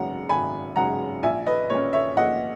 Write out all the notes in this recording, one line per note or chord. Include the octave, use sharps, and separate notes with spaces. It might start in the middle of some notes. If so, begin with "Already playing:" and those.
Already playing: G#1 F#2 C#3 G#3 F#5 A#5
G#1 G#5 B5
F#2 C#3 G#3 F#5 A#5
A#1 E5 G#5
B4 D#5
A#2 A#3 C#4 C#5
C#5 E5
A#1 D#5 F#5